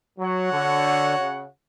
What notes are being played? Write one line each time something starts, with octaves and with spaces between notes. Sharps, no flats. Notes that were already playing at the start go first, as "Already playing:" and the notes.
F#3 F#4 C#5 F#5
D3
C#3